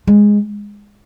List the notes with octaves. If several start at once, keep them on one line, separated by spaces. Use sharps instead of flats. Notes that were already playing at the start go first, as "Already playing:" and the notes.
G#3